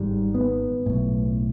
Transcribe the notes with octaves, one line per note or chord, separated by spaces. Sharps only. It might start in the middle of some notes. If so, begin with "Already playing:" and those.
Already playing: G#1 G#2 G3
B3
B1 A2